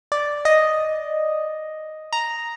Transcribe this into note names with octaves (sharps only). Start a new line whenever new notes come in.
D5
D#5
A#5